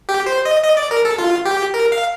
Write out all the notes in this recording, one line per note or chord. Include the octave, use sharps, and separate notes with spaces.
G4
C5
D#5
D#5
D5
A#4
A4
F4
G4
A#4
F5